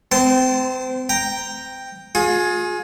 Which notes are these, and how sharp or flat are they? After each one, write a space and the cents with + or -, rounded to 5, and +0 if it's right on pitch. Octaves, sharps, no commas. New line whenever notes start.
C4 -30 A5 -10 C6 +0
G5 +0 A#5 +0
F4 +40 G#4 +15